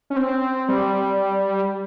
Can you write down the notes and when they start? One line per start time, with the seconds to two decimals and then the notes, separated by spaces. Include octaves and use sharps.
0.10 C#4
0.16 C4
0.68 G3